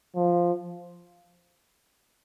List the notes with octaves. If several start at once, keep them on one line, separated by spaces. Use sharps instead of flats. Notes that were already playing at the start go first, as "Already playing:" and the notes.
F3